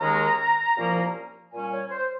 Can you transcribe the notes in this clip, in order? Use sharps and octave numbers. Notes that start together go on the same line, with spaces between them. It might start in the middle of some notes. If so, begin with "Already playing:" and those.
D#2 D#3 G#3 C#4 A#5
C2 A#2 F3 A#3 C#4
A#2 G3 C#4 G#5
C#5
C5